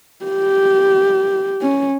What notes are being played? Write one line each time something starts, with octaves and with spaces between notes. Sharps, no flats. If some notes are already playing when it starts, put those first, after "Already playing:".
G4
C#4